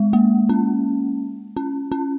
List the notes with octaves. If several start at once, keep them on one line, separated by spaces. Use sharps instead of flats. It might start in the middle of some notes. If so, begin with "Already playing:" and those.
Already playing: G#3
A#3
C#4
C#4
C#4